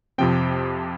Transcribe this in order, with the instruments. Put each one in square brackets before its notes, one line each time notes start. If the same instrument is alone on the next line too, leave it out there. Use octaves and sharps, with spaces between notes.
[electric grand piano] F2 C3 F3 C4 G5